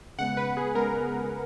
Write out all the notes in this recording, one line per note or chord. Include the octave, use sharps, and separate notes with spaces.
C#3 G#3 B3 F#5
B4
G#4
C#3 G#3 B3 A#4